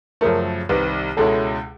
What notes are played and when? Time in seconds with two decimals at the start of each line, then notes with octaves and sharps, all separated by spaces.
0.21 F#2 C#3 F3 A3 A#4
0.69 C2 C3 D#3 G3 B4
1.17 C#2 B2 G#3 C#4 E4 A4